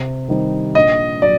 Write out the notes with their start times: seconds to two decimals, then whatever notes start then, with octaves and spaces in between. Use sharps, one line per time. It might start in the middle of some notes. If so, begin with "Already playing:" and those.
Already playing: C3
0.28 D#3 G3 C4 D#4
0.75 A#1 D#5
1.22 F#3 D5